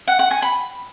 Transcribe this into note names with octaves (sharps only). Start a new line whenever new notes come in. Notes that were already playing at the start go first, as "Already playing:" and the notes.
F#5
F#5
G#5
B5